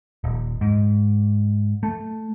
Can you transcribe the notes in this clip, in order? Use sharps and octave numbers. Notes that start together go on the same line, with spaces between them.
D#1
G#2
A3